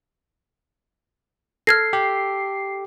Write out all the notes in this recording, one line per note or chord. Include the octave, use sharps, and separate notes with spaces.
A4 F6 G#6 A#6 C7
G4